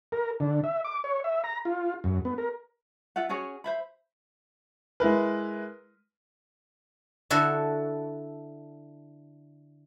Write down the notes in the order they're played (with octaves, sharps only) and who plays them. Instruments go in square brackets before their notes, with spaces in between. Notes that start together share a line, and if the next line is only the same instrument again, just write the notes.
[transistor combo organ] A#4
D3
E5
D6
C#5
E5
A#5
F4
F#2
B3
A#4
[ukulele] F4 E5 F#5
C#4 F#4 G#4 C#5
C5 E5 B5
[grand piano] G#3 E4 A#4 B4
[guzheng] D3 E4 F#4 A4